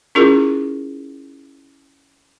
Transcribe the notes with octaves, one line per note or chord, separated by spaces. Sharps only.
C#4 E4 F4 G#4 A#4